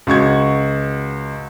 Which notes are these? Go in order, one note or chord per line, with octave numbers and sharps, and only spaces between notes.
C#2 F#4 C#6 G#6